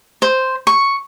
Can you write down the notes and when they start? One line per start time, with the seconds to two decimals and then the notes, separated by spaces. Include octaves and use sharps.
0.22 C5
0.67 C#6